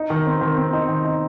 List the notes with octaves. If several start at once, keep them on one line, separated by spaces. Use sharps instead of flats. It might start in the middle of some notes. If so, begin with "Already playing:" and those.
Already playing: D#4
D#3
C4
D#3
C4
D#4
D#3
D#4